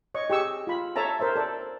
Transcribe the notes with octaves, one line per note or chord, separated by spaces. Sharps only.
C#5 D#5 C#6
G4 G#4 C#6 E6
F4 B5
A4 C#5 E5 A5 A#5
A#4 C5 C#5 E5
A4 D5